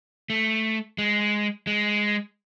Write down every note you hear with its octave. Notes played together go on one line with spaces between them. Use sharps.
A3
G#3
G#3